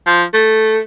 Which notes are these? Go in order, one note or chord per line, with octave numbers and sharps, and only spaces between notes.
F3
A3